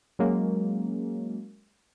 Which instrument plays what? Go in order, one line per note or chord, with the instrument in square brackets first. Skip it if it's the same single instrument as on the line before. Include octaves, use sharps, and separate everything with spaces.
[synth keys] F#3 G#3 A#3 C#4